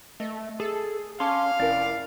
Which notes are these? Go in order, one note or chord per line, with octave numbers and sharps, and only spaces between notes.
A3 D#5
G#4 A4
C#4 F5 A5 C6 D6
F1 C#4 E4 A#4 D5